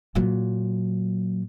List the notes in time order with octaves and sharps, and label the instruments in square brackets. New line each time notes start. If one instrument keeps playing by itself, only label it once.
[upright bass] A#2 F#3